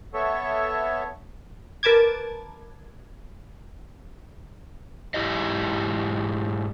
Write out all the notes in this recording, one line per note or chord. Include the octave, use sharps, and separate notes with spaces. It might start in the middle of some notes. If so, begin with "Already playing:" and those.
B3 A4 C#5 E5 C#6
A#4 B4 A5 D6 G#6
G#2 E4 G4 D#5